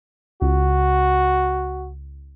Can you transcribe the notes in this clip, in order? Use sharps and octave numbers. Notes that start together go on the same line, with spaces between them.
C#2 F#4